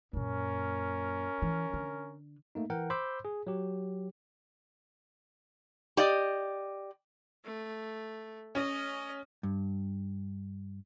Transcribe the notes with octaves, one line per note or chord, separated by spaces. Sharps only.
F#2 A#2 C#4 A#4
E3
D3
A3 A#3 D#4
E3 A#4 F#5 G5
C5 B5 C6 D6 E6 G6
G#4
F#3 G4
G4 D5 D#5
A3
C#4 D#5
G2